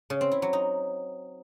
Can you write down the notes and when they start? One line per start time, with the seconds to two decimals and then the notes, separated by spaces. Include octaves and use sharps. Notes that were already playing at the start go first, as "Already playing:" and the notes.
0.10 C#3
0.21 C4
0.32 E4
0.42 F#3
0.53 D#4